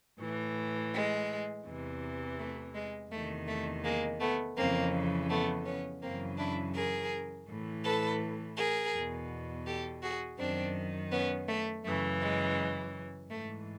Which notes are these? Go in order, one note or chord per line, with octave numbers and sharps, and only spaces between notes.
A2 E3
G#3
E2 C3 E3
A3
G#3
E2 C3 D#3 A3
A3
G#3 A#3
A3 B3
F2 C#3 E3 A#3 C4
A3 B3
B3 C#4
F#2 C#3 E3 A#3 C4
D4 E4
G#4 A#4
A2 E3
A4 B4
G#4 A#4
E2 B2
G4 A4
F#4 G#4
F#2 D#3 C4 D4
B3 C#4
A3
F#2 C#3 E3 A3
G#3
G#2 E3 A3